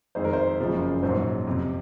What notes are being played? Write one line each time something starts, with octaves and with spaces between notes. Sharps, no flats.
F2 D#3 G#3 C5
A#4
C5
F#1 F#2 C#3 F3 G#3
A#1 G#2 F#3 C5
F2 C3 F3